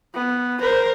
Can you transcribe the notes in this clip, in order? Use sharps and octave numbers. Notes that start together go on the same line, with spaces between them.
B3
A#4 C5